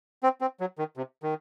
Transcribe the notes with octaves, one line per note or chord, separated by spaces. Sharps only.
C4
C4
F#3
D#3
C3
D#3